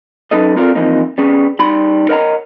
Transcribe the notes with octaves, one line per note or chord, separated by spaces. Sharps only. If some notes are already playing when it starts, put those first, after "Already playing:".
F#3 C#4 D#4 A4 B4 D#5
C4 F4 A4 A#4 D5 F5
E3 F3 A#3 C4 D#4
G3 B3 C#4 G#4
G3 D#4 B5 C6
A#4 C#5 D#5 F#5 G#5 A#5